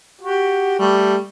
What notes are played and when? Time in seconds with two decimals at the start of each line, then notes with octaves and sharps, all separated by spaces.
0.22 F#4 G4
0.79 G3 A3